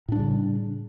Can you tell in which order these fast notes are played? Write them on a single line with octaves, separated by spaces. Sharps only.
A2 D4 G3 C#3